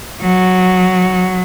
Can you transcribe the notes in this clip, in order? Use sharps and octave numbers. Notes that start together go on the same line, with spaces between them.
F#3